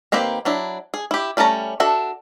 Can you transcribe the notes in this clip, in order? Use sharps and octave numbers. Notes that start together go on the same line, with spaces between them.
D#3 A#3 C4 G4 B4
F#3 D4 E4
G#4
E4 G4
G3 A3 C#4 A5 A#5
D4 F#4 A4 E5